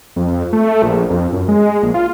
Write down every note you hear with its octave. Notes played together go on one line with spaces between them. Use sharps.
F2
A3
A#1
F2
F#2
G#3
A#1
F4